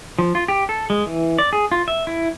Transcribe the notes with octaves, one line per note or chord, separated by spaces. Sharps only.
F3
F4
G4
A4
G#3
E3
D5
G#4
F4
E5
E4